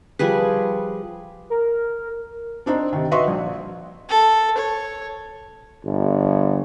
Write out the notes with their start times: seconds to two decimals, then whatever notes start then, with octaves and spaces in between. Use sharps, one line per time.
0.19 F3 G3 G#4 B4
1.50 A#4
2.66 C4 D4 D#4 C5
2.93 C3 D#3
3.11 F#4 B4 D#5 E5 C6 C#6
3.27 A#1
4.09 A4
4.58 C#5
5.85 G1